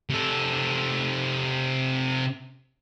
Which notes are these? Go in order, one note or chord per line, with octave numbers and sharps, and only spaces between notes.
C3 A4